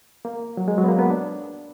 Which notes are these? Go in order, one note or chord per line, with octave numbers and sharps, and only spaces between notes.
A#3
F#3
G#3
F#3
B3
A#3
B3
D4